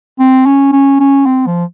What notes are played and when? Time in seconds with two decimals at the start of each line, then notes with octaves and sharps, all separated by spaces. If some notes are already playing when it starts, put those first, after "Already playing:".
0.20 C4
0.46 C#4
0.73 C#4
1.01 C#4
1.27 C4
1.47 F3